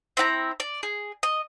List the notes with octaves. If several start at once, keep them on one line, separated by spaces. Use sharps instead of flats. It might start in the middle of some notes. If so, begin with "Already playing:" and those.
C4 E4 F#5 A#5
D5
G#4
D#5